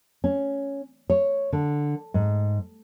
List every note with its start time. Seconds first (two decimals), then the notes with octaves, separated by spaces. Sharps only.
0.24 C#4
1.10 C#5
1.53 D3
2.14 G#2